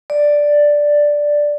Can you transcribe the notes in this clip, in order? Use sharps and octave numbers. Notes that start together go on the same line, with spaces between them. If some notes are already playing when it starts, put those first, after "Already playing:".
D5